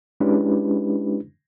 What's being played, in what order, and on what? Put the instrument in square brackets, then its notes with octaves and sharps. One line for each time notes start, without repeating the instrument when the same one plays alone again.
[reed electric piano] G#3 C#4 D4 E4 G4 B4